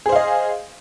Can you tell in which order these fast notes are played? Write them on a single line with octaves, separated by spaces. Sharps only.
G#4 C5 F5 D#5